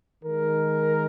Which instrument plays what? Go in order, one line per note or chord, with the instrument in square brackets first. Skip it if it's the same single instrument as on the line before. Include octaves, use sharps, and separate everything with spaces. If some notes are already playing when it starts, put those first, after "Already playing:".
[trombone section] D#3 G#3 A#4